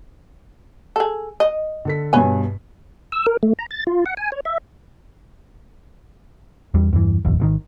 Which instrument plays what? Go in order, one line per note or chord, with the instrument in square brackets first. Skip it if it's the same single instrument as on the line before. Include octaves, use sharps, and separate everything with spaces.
[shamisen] G#4 A4
D#5
[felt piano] D3 A4 B6
[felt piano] G2 B2 [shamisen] B4 C#5 G#5
[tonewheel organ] E6
A#4
A3
A#5
A6
F4
F#5
G#5
C#5
E5
[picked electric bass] E2 G3
E2 G2 E3
F1 A#1 D#2
G#1 B2 D#3